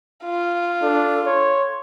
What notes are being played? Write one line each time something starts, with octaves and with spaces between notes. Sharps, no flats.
F4
D4 A4
C#5 C6